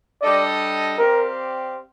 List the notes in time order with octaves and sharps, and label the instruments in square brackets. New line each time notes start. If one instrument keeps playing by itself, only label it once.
[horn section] G3 D4 A4 D#5 [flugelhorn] D5
[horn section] C4 G4 D5 F5 [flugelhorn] A#4